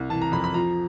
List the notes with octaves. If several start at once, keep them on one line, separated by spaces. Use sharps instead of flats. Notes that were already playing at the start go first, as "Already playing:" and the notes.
Already playing: C2
E3 A5
A#5
F2 B5
B5
F3 A#5